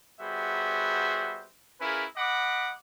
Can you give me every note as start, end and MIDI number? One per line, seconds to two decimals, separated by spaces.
0.19 1.47 55
0.19 1.47 59
0.19 1.47 66
0.19 1.47 68
0.19 1.47 72
0.19 1.47 76
1.81 2.05 61
1.81 2.05 64
1.81 2.05 65
1.81 2.05 68
1.81 2.05 70
1.81 2.05 71
2.16 2.72 75
2.16 2.72 78
2.16 2.72 83
2.16 2.72 86